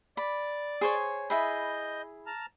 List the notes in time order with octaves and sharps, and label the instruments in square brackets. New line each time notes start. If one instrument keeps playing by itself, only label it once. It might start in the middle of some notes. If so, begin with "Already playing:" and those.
[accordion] D5 D6 [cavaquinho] B5
[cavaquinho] G#4 C5 C#5
[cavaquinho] E4 G#4 B5 [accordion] D#5 G6
[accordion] A5 A#5 F6